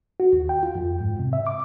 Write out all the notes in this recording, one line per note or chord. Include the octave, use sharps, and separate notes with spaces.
F#4
D#2
G5
F4
F2
G#2
C3
E5
D6